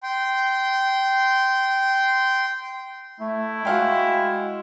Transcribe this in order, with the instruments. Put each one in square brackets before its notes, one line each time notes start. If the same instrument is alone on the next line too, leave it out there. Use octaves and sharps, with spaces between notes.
[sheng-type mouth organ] G5 C6
[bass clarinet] A3 [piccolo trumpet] E4
[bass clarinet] G#3 [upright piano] F#4 F5 G5